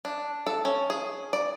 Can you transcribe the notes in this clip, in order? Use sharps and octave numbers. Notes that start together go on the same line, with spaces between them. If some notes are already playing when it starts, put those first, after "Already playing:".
D4
A4
C#4
G#4
D5